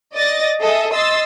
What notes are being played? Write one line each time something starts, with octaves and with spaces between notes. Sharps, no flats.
D5 D#5 A6 A#6
G#4 A4 D#5 E5
D#5 C6 E6 A6